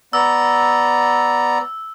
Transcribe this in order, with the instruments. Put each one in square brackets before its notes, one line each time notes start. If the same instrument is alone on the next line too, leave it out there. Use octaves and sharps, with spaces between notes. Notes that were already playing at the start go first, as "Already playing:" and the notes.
[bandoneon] B3 D5 A#5 [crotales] E6